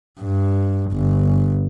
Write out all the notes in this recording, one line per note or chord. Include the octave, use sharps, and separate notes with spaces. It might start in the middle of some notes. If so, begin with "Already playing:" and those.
G2
G1